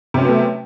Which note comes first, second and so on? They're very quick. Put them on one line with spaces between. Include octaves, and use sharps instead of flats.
C3 C#4 F#3 B3 A3